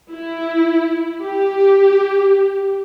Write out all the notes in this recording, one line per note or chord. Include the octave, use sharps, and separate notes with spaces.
E4
G4